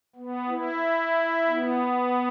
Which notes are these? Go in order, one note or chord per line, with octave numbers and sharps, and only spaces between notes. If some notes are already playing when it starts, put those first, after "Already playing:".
B3
E4
B3